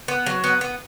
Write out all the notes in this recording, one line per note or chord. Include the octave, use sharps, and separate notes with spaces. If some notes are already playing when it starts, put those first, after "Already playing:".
B3
F#3
B3
B3